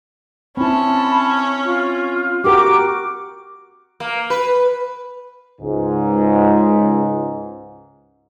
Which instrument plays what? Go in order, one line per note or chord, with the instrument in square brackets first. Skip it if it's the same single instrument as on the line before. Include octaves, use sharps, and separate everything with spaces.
[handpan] C4 E4 [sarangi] C#4 [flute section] A5 B5
[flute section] F4
[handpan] F#4 G4 A#4 [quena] D6
[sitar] A#3
B4
[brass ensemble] C#2 G#2